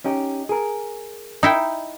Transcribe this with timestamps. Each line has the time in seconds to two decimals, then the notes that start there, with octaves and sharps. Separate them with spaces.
0.04 C#4 D#4 G4
0.49 G#4 A#4
1.43 D#4 E4 G5